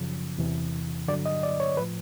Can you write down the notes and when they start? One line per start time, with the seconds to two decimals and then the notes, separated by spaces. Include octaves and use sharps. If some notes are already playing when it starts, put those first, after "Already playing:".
Already playing: F#2 C#3 F3
0.38 E2 C3 E3
1.08 G2 D3 F#3 D5
1.26 D#5
1.43 D5
1.60 C#5
1.77 A2 F3 B4